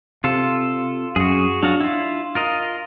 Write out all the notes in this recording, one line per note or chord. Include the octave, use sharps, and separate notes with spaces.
C3 F4 A4
F#2 F#4 G#4
F#3 D4 F4 F#4
E4 F4
F4 A#4 D#5